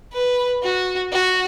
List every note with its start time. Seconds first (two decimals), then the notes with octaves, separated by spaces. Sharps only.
0.13 B4
0.63 F#4
1.12 F#4